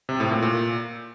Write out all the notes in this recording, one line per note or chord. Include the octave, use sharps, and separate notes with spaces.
C3
A2
A#2
A#2